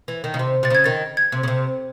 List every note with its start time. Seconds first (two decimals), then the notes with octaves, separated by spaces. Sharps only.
0.08 E3
0.24 D#3
0.34 C#3
0.39 C3
0.63 C3 A6
0.70 C#3 G#6
0.84 D#3 A6
1.17 G#6
1.32 C3
1.43 C#3
1.48 C3